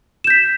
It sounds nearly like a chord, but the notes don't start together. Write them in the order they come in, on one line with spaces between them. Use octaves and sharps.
E7 G6 B6